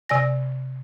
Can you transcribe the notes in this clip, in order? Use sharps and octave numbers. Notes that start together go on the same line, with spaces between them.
C3 D5 G#5 A#6